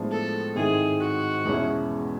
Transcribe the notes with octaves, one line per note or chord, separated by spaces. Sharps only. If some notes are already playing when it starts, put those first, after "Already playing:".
Already playing: A2 F3 G#3 B3 D4
A4
G#2 D#3 G#3 C4 E4 G#4
F#4
E2 B2 G#3 C#4 E4